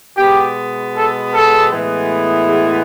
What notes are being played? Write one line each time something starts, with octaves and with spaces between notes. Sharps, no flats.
B2 G#3 B3 G4
A4
A4
A2 E3 G#3 B3
G#4